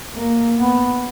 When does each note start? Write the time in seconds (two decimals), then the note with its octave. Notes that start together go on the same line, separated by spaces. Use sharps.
0.15 A#3
0.58 B3